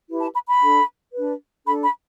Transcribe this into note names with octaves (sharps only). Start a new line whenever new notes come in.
E4 G4 B4
A5
B5
B5
D4 A4
D4 B4
D4 A4 B5
B5